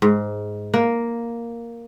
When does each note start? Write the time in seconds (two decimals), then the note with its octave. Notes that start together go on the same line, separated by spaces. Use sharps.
0.02 G#2
0.74 A#3